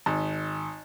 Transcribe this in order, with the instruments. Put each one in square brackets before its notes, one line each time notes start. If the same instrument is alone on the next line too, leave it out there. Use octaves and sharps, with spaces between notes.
[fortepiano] G#1